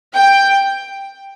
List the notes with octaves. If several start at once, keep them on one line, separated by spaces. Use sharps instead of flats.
G5